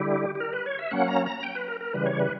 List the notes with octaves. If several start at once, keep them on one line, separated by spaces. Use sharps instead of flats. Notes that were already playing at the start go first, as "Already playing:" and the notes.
Already playing: D3 G3 E4 G4
G4
A#4
B4
C#5
E5
F#3 A#3 C#4 F#5
A#5
A#5
G5
B4
A#4
A#4
C#3 E3 G3 B4
C#5
B4